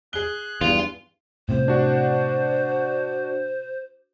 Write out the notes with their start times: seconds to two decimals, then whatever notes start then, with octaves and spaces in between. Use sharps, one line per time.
0.13 G#4 F#6 G7
0.61 E2 G2 F4
1.49 A2 C3 C5
1.68 D4 F#4 F#5